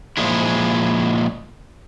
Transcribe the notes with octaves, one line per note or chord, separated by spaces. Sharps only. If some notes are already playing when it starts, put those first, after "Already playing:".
A#2 F3 G#3 E4